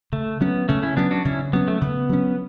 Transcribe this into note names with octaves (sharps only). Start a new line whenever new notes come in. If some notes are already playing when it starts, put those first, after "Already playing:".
C#3 A3
F#3 B3 C#4
C#3 A3 C#4
C#4 E4
F#3 B3 C#4 D4
D4 F#4
C#3 C#4 E4
F#3 B3 C#4
A3
C#3 B3
F#3 C#4